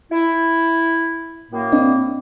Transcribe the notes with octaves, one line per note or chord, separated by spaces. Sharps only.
E4
F#2 A2 A#3
C4 D4 D#5